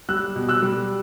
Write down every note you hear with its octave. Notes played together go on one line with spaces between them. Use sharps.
G3 E6 F#6
B2
E6 F#6
G3